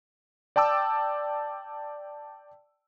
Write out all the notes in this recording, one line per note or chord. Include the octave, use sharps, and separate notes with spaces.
D5 G5 A5 D6 E6